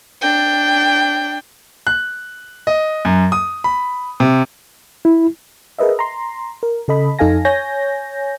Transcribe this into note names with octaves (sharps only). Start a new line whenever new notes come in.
D4 G5
F#6
D#5
F#2
D#6
B5
C3
E4
G#4 A#4 B4 D#5 E5
A#5 C6
A#4
C#3 A4 D#5 B5
F2 D#4 A4 F5 G#5 A#6
C#5 G#5 G6 A#6